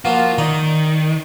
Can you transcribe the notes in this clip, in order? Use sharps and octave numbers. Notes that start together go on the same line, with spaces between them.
F3 A#3 F4 F#4
D#3 D5 D#5 A#5